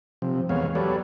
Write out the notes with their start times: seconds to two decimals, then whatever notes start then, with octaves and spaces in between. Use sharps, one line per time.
0.22 C3 F3
0.49 E2 G#3 B3 C#5 F5
0.75 F#3 G4 A4 B4 C#5 D5